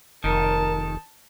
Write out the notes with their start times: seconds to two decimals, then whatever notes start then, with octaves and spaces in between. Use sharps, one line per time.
0.24 F1 D#3 A#4 A5